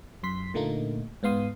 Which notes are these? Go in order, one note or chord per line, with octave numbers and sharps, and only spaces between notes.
F#2 C6 B6
A#2 D3 A3 A#3 D#4
G#2 B3 F5 C6 D#6